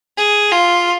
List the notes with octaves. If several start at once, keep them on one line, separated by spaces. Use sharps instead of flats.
G#4
F4